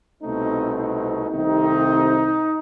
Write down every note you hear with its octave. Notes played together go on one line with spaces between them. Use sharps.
C2 B2 A3 C4 D#4
D#4
C2 C3 D#3 A3 C4 D#4